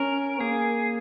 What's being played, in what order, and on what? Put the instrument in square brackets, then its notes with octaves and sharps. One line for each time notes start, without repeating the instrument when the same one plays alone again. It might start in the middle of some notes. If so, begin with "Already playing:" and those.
Already playing: [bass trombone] C#4 [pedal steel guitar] A#4
[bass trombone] A#3 [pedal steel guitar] G#4